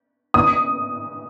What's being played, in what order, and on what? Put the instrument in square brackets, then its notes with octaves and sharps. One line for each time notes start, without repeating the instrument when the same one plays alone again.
[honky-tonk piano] D#6